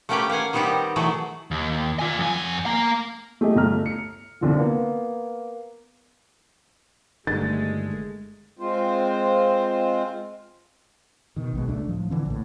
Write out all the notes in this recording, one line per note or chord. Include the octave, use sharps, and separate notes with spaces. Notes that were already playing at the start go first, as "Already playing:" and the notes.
A3 A#3 C#4 G4 B4 G5
A#3 F5 F#5 G#5
D#3 G3 B3 C4 D#4 G4
B2 E3 F#3 A3 E4 G#4
D#2
F4 G#5
F2 G#5
A#3 A#5
A3 G4 G#4 D#5
G1 A3 A#5 F6
C#7
C2 D3 F3
A#3 B3
G1 G2 D#3 G#3 A3 A6
G#3 C4 F4 C5
B2 D#3
A#1 B2 G#3
C#2 A3 D4
A2 F3 F#3
D3 E3 C4
A#1 A2